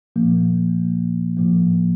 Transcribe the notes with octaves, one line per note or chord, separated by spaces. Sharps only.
A#2 F3 A#3
A2 F3 A#3